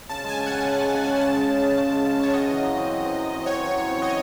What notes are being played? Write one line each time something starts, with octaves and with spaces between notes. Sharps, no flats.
C#3 A5
G#3 G#5
C#3
F#5
C#4
C#3
G#3
C#3
C#4
C#3 A5
G#3
C#3
C#4
C#3
G#3
C#3
C#4 C#5
F#4 D#5
E3
F#2
C4
F#4
E3
F#2
C4
F#4 C#5
E3
F#2
C4
F#4 D#5